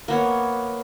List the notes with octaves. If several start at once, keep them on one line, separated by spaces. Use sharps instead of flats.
A#3 B3 C#5